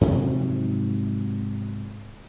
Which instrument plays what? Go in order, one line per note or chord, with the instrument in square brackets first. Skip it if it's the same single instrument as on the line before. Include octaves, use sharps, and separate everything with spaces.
[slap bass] G#2 C3 F3 F#3